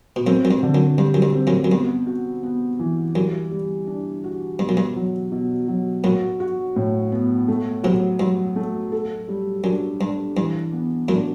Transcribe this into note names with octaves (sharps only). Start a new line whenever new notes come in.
B2
F#2 A2 C4
F#2
G2
D3
F#2
G2 G3
F#2
G2
C4
F#2 A2
F#2
G2 B3
F#4
B3
E3
F#2 G3
G3
D4
F#4
G2 B2
F#2
G2
F#3
B2
F#3
F#2 A2 F#4
F#4
A2
B3
A3
A2 C3 F#3
G2 F#3
A3
A4
G3
F#2 D4
G2 D4
G2 E3
B3
F#2 A2 D4